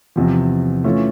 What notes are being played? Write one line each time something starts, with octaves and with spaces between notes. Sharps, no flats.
E2 C3 F3
E3 A3 C#4 F4